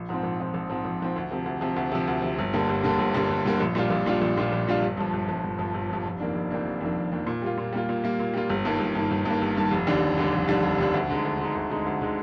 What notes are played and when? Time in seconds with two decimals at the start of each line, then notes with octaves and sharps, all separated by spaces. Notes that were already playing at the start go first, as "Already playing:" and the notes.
Already playing: A#1
0.09 G#2 F3 C4
0.23 A#1
0.40 G#2 F3 C4
0.54 A#1
0.70 G#2 F3 C4
0.84 A#1
1.00 G#2 F3 C4
1.16 D2
1.31 C3 F3
1.46 D2
1.61 C3 F3
1.76 D2
1.92 C3 F3
2.07 D2
2.22 C3 F3
2.38 G1
2.53 G2 D3 G3 A#3
2.69 G1
2.83 G2 D3 G3 A#3
2.98 G1
3.14 G2 D3 G3 A#3
3.30 G1
3.45 G2 D3 G3 A#3
3.60 A#1
3.75 A#2 G3 D4 F4
3.90 A#1
4.06 A#2 G3 D4 F4
4.21 A#1
4.37 A#2 G3 D4 F4
4.52 A#1
4.67 A#2 G3 D4 F4
4.82 G1
4.97 G2 F3
5.13 G1
5.29 G2 F3
5.44 G1
5.59 G2 F3
5.74 G1
5.90 G2 F3
6.05 F1
6.20 F2 D#3 A#3 D4
6.35 F1
6.50 F2 D#3 A#3 D4
6.65 F1
6.81 F2 D#3 A#3 D4
6.97 F1
7.12 F2 D#3 A#3 D4
7.26 A#2
7.42 G3 A#3 F4
7.57 A#2
7.73 G3 A#3 F4
7.89 A#2
8.04 G3 A#3 F4
8.19 A#2
8.33 G3 A#3 F4
8.49 G1
8.65 G2 D#3 A#3
8.79 G1
8.95 G2 D#3 A#3
9.11 G1
9.25 G2 D#3 A#3
9.42 G1
9.57 G2 D#3 A#3
9.71 F1
9.87 D#2 D3 G3 D4
10.02 F1
10.18 D#2 D3 G3 D4
10.32 F1
10.47 D#2 D3 G3 D4
10.63 F1
10.78 D#2 D3 G3 D4
10.94 D2
11.10 D3 G#3 D#4
11.25 D2
11.39 D3 G#3 D#4
11.55 D2
11.70 D3 G#3 D#4
11.86 D2
12.01 D3 G#3 D#4